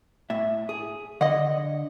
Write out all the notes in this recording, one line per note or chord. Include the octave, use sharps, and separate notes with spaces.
A2 E5
G#4
D3 D#5 F#5